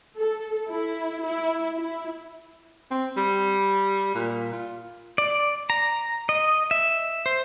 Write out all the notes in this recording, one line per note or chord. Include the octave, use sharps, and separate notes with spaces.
A4
E4
E4
E4
C4
G3
A#2
F4
D5
A#5
D#5
E5
C5